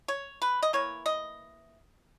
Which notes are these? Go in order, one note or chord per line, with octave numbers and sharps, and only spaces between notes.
C#5
B4
D#5
E3 A#3 C#5
D#5